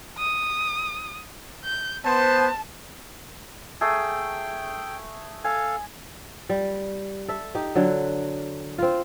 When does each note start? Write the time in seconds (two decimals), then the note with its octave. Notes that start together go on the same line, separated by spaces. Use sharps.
0.19 D#6
1.65 G6
2.05 B3 C5 A5
3.81 A3 G#4 G5
5.44 A4 F5 G#5
6.49 G3
7.28 A4 E5
7.55 D#4 G4
7.75 D3 F#3
8.78 C4 F4